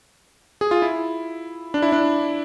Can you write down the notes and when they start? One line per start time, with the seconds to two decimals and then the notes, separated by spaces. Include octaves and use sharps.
0.61 G#4
0.71 F4
0.82 E4
1.74 D4
1.82 E4
1.92 D4